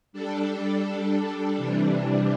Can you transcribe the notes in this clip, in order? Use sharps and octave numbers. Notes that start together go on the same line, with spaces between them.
G3 D4 A4
C3 E3 G3 D4